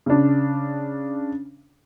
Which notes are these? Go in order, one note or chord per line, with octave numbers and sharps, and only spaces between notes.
C#3 D4